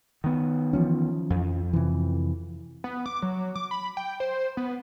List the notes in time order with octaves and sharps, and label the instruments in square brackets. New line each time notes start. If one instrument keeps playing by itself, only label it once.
[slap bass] D#3 B3
[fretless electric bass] E3 F3 C#4
[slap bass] F2
[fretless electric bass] C3 E3
[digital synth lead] B3
D6
F#3
D6
B5
G5
C5
B3